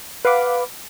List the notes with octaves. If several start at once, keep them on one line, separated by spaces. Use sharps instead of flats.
B4 F5 F#5 B5 D6